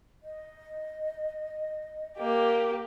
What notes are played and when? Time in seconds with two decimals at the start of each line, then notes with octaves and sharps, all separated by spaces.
0.23 D#5
2.17 A#3 G4